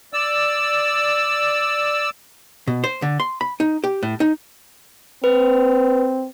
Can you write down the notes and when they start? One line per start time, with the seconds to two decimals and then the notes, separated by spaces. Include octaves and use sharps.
0.13 D5 E6
2.67 B2
2.84 C5
3.02 D3
3.20 C6
3.41 B5
3.60 D#4
3.84 G4
4.03 A2
4.20 D#4
5.24 C4 B4